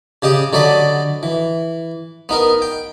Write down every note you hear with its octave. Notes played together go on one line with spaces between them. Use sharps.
C#3 G4 D#5 G5
D3 F#3 D5 D#5 B5
E3
B3 D#4 A#4
G5